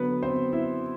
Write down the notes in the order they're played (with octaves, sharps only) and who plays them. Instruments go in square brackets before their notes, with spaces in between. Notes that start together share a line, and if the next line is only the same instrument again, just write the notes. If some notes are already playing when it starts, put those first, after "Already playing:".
Already playing: [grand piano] D3 F#3 B3 B4
C4 C5
E4 E5